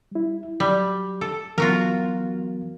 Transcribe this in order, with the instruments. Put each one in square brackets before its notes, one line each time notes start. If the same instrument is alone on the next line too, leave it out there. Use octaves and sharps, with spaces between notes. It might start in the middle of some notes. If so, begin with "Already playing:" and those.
[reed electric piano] G3 E4
[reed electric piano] F#3 [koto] G3
[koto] A4
[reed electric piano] E3 F#3 B3 [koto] F4 F#4 A#4